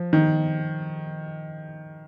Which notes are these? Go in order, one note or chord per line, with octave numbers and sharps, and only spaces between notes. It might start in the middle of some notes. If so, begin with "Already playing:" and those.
Already playing: F3
D#3